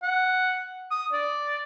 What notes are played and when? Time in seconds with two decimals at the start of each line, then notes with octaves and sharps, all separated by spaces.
0.03 F#5
0.91 D#6
1.12 D5